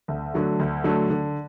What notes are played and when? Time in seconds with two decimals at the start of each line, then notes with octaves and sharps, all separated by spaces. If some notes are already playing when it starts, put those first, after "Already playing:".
0.08 D2
0.34 D3 F#3 A3
0.60 D2
0.84 D3 F#3 A3
1.10 D3